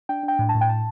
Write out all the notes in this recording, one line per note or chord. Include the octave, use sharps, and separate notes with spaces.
D4 G5
D4
G5
A2
A5
A2
G5
A5